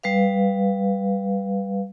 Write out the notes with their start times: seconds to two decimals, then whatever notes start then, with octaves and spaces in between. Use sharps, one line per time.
0.03 G3 B4 F5